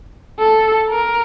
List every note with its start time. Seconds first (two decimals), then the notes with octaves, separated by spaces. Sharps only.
0.40 A4
0.90 A#4